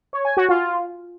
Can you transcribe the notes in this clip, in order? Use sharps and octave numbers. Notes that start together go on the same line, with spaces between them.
C#5
G#5
F#4
F4